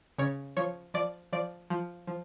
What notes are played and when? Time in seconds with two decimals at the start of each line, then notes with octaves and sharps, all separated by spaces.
0.18 C#3 C#5
0.57 F3 C#5
0.94 F3 D5
1.33 F3 D5
1.70 F3
2.07 F3